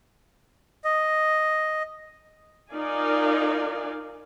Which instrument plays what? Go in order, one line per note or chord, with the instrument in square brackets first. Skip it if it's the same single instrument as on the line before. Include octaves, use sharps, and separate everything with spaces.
[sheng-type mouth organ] D#5
[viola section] D#4 F4 A#4 D5 F5 G#5